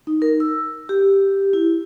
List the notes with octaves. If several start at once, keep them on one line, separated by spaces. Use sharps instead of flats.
D#4
A#4
E6
G4
E4